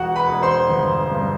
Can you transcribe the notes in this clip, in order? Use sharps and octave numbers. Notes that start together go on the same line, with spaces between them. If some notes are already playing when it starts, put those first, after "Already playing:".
Already playing: E1 F#4 F#5
B4 B5
E1
C5 C6
G1
G2